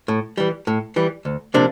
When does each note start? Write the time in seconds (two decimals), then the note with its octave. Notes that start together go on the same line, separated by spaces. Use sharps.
0.08 A2
0.38 E3 G3
0.67 A2
0.96 E3 G3
1.25 D2
1.54 C3 F3 A#3 D4